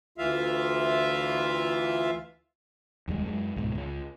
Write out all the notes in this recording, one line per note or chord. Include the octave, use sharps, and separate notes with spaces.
D2 E3 F4 E5 F5
F1 D#2 G3 G#3
F#2 G#3
C#2 G#2 B2
C#2